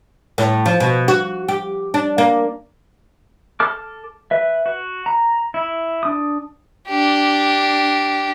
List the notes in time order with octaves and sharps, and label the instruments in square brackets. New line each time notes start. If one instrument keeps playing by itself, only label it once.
[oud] A2
F3
B2
F#4
G4
D4
A#3
[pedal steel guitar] A4 A5 D6 F6
B4 E5
F#4
A#5
E4
D4 D#6
[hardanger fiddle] D4 G4